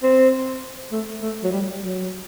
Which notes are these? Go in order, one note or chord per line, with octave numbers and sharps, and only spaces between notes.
C4
A3
A3
F#3
G3
F#3